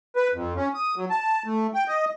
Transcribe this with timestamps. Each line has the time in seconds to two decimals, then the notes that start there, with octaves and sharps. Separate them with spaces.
0.16 B4
0.34 F2
0.57 C#4
0.74 D#6
0.96 F#3
1.10 A5
1.46 A3
1.74 G5
1.88 D#5